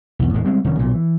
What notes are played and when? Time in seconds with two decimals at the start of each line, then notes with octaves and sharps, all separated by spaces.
0.19 B1 E2
0.33 D#1 A2 G#3
0.45 G3 G#3 C4
0.64 F1 D#3 C#4
0.79 B1 A#2
0.94 E3